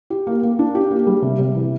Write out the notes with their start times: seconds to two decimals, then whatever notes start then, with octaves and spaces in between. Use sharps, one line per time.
0.10 G4
0.27 A#3
0.43 A#3
0.59 D4
0.75 G4
0.91 A#3
1.07 G3
1.22 C3
1.39 C3
1.55 E3